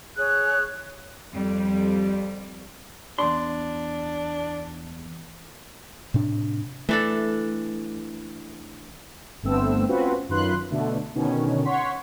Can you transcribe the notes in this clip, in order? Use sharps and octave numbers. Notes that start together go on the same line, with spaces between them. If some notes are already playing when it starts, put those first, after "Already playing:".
G#4 C#5 F#6
F2 G3
E2 D4 C6
A2 C3 D4
E3 A3 D4 A4
G1 G2 A3 B3 C4 E6
C4 C#4 F4 F#4 B4 C5
F#2 D#3 F4 B4 C6 F#6
B2 D3 A3
B2 D3 D#3 C#4
C#5 F#5 C6 B6